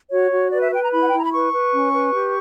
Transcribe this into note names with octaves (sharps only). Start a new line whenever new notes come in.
F#4 C#5
F#4
B4 D5
E5
B4 G5
A#5
E4 B5
F#5
G5
E4 A#5
B5
B4 C#6
B4
C#4
B4
G4